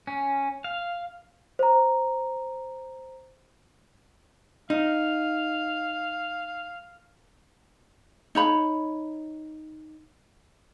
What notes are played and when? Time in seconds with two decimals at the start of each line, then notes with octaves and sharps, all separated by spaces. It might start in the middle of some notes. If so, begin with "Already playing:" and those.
0.07 C#4
0.64 F5
1.59 C5 A#5
4.70 D#4 F5
8.35 D#4 C#5 B5